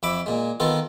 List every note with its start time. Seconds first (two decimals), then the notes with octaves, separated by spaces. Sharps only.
0.03 F2 E5 B5 D6
0.26 A#2 G#3
0.60 D#3 B3 F4 A4